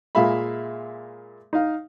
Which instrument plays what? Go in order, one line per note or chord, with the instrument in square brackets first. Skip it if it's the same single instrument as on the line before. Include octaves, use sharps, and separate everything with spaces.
[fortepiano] A#2 G#3 E5 F5 B5
D#4 F5